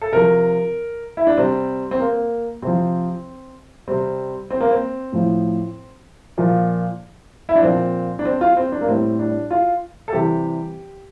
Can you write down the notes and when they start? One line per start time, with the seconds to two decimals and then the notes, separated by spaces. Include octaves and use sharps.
0.02 A4
0.12 C3 F3 A#4
1.17 E4
1.27 D4
1.37 C3 G3 C4
1.91 C4
2.00 A#3
2.62 C3 F3 C4
3.88 C3 G3 C4
4.50 C4
4.60 A#3
4.71 C4
5.12 A2 F3
6.38 A#2 F3
7.49 E4
7.56 D4
7.62 A#2 F3 C4
8.19 D4
8.25 C4
8.41 F4
8.57 C4
8.72 D4
8.81 A#3
8.88 A2 G3 C4
9.19 D4
9.51 F4
10.08 A4
10.13 C3 E3 G3 G4